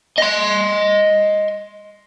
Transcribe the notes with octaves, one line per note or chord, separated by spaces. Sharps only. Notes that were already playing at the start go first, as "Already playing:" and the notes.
D#5 C6